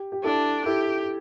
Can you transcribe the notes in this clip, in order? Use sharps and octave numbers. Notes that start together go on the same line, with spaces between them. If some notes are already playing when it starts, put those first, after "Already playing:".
Already playing: G4
G4
D4 E4 A4
E4 G4 A4